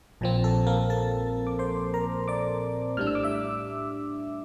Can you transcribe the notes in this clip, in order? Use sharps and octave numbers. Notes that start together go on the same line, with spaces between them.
A#1 A#2 F3 C4
A4
A#3 A#4
A4 A5
D6
C5 C6
A#4 A#5
D5 D6
A2 G3 D4 F6
E6
D6
E5 E6